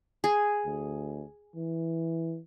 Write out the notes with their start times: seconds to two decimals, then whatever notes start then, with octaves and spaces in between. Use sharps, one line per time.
0.24 G#4
0.66 D2
1.56 E3